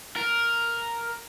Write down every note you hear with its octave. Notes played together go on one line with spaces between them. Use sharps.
A#4